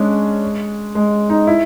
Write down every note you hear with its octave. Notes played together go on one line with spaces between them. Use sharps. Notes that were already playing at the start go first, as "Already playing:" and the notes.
Already playing: G#3 C#4 D4
G#3
D#4
E4